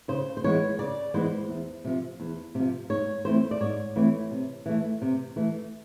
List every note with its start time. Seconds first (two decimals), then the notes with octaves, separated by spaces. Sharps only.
0.08 C#3 C5
0.37 C5
0.44 E3 G#3 B3 C#5
0.79 C#3 D5
1.14 E3 G#3 B3 C5
1.49 E2
1.85 C3 F3
2.20 E2
2.55 C3 F3
2.90 G#2 C#5
3.25 E3 A3 C4 C5
3.51 D5
3.60 G#2 C#5
3.96 E3 A3 C4
4.31 C3
4.66 E3 A3
5.02 C3
5.36 E3 A3